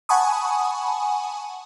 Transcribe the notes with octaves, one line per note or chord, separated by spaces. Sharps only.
F#5 G#5 A5 B5 C#6 D#6